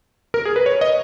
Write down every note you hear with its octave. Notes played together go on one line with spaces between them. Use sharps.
A#4
G#4
B4
C#5
D#5